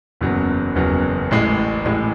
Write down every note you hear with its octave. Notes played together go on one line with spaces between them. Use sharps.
F#1 E2 C#3 F#3 B3
F#1 E2 C#3 F#3 B3
A1 A2 G#3
A1 A2 G#3